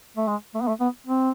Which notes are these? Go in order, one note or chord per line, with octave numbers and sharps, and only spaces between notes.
A3
G#3
A3
B3
A3
B3
C4